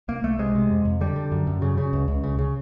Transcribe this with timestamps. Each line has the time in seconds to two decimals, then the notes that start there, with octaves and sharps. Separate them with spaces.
0.08 C2 A#3
0.23 C2 A3
0.39 C3 G#3
0.55 C3
0.70 F2
0.85 F2
1.01 D3 G3
1.16 D3
1.32 F#2
1.47 F#2
1.62 C#3
1.78 C#3
1.93 C#2
2.08 C#2
2.24 C#3
2.39 C#3